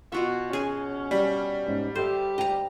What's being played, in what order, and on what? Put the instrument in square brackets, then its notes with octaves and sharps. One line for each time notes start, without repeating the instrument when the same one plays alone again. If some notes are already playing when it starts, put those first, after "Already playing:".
[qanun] B2 F4 E5 [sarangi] F#4
[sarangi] C#4 [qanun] G#4 G#5
[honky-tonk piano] G3
[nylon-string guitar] G#2 C#4
[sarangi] G4 [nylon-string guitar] A4 E5 [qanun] C5
[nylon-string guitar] D2 G5 [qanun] D#5 A#5